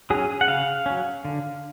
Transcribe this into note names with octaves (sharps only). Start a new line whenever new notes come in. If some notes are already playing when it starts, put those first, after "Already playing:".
F#3 C#4 G#4
F#5
C#3 F5
F#3 C#4
D3